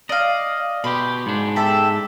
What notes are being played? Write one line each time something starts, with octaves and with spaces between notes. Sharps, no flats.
D5 D#5 F5
B2 G4 B5 C6
G#2 D4
G4 A4 E5